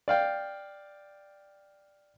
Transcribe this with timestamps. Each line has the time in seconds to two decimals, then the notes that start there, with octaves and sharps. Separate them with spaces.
0.08 D5 F5 G5